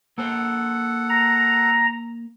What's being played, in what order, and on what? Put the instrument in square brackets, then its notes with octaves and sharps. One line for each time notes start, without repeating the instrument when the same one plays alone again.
[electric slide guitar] A#3 C5 [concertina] A4 F#5
[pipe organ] A#5